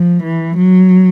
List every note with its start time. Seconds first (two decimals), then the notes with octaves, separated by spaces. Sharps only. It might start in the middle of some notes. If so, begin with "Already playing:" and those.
Already playing: F3
0.23 E3
0.57 F#3